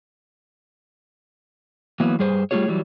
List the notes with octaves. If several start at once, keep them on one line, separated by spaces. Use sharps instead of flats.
E3 F#3 A#3 B3
G2 G3 G#4 B4 C5
G3 A3 C#4 F4 G#4 C#5
E3 F#3 G3